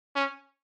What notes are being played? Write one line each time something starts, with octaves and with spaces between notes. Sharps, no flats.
C#4